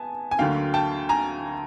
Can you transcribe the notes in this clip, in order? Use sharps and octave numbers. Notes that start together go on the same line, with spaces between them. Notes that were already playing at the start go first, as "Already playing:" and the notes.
Already playing: B3 G#5 A5
G#5
D2 D3 F#3 A#3 F5 G5
G5 A5
G#5 A#5